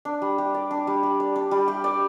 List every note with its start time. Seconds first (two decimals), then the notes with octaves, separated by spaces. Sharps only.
0.05 D4
0.22 G3
0.38 G4
0.54 D5
0.71 D4
0.87 G3
1.03 G4
1.20 D5
1.36 D4
1.51 G3
1.68 G4
1.84 D5